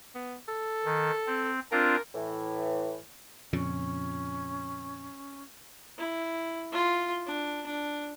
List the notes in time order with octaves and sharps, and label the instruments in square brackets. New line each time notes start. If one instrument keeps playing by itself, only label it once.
[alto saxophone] B3
A4
[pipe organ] D#3
C4
[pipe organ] C4 D4 F4 [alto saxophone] A#4
[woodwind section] A2 E3
[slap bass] F2 A#2 C#3 [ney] C#4
[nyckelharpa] E4
F4
D4
D4